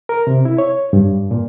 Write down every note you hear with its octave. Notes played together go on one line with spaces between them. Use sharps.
A#4
C3
E4
C#5
G2
A#2